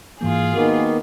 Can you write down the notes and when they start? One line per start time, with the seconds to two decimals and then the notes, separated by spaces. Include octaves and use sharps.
0.21 G#2 E3 A#3 F4 G#4
0.53 D#3 A#3 B3 F#4